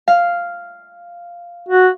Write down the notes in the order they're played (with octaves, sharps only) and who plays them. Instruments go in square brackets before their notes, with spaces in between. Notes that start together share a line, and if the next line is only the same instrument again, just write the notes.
[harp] F5
[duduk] F#4